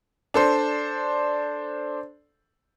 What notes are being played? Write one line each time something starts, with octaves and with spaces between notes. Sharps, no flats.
D4 A4 C5